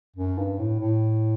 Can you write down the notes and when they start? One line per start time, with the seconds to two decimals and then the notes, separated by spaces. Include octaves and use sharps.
0.16 F#2
0.38 G2
0.59 A2
0.80 A2